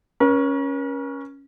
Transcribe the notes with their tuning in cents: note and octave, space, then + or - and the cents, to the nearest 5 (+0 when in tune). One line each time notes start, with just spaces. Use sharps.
C#4 +0 A#4 +45